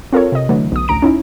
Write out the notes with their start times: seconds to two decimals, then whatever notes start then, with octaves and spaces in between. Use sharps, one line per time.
0.13 C4 F4 A4 A#4 C#5
0.32 C3 D#5
0.49 D3 E3 F#3 A3
0.72 B1 D#6
0.88 A1 D2 A#5 D7
1.02 C#4 D#4 E4